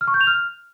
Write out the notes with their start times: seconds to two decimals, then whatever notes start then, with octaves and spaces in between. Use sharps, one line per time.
0.01 F6
0.08 C#6
0.14 G6
0.21 F7
0.27 F6